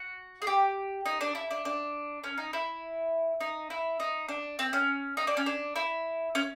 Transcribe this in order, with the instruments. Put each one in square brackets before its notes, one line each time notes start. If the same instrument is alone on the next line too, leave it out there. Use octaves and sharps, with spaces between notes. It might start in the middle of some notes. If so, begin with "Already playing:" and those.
Already playing: [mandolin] F#4
G#4
G4
D#4
D4
E4
D4
D4
C#4
D#4
E4
D#4
E4
D#4
D4
C4
C#4
D#4
D4
C#4
D4
E4
C#4